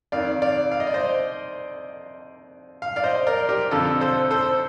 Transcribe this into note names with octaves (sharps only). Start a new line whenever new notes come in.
F2 D#3 D5 F5
D5 F5
F5
D#5
D5
C5 D#5
F5
D5 F5
C5 D#5
A#4 D5
G4 A#4
F2 D3 F3 F4 A4
A4 C5
A4 C5